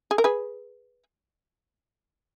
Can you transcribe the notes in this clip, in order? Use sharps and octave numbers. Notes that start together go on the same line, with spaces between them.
G#4
A#4
G#4 B4